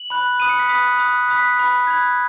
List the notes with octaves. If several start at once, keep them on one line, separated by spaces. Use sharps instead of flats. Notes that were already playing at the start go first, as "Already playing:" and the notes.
Already playing: F#7
B5 F#6
B5 D#6 F#6 D#7
C#7
B6
B5 D#6 F#6
B5 D#6 F#6
B5 D#6 F#6 B6
B5 F#6
B5 F#6 G#6